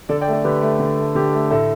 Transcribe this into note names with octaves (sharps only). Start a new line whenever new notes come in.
D3 A4 D5
D5 G5
A3
A4 D5
D3 G4 B4
A3
D3
A3
D3 G4
A3
A2 A4